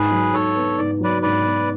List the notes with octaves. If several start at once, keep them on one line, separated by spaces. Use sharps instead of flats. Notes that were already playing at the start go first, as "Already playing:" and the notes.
Already playing: G#2 G#4 B4
F#3
G#2 A4 C#5
B3
G#2 D5
F#3 B4 D5
G#2 B4 D5
B3